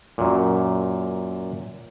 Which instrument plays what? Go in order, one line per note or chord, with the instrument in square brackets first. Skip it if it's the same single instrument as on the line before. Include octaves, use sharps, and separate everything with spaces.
[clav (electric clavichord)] F#2 A#2